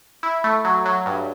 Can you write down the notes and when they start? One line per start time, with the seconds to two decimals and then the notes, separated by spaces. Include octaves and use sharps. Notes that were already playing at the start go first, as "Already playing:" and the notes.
0.23 E4
0.44 A3
0.65 F#3
0.86 F#3
1.06 G2